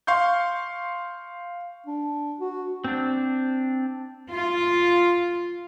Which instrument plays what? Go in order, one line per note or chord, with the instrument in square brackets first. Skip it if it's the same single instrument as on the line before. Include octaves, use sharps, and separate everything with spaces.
[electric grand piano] F5 C6 C#6 G6
[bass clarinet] D4
F#4
[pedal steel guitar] C4 D4
[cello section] F4